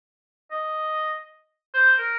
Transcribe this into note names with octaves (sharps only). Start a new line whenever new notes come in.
D#5
C5
A#4